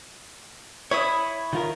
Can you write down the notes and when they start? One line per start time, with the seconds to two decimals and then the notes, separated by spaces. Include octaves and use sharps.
0.91 E4 C#5 B5 D#6
1.53 D#3 F4 A#4